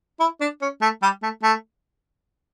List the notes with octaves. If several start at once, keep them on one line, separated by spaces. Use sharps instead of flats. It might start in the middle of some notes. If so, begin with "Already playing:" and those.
E4
D4
C#4
A3
G3
A3
A3